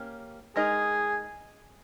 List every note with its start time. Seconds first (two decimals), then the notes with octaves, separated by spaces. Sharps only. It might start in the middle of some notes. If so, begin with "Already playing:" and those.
Already playing: A#3 C#4 G4
0.56 G#3 D#4 G#4 A#4 D#5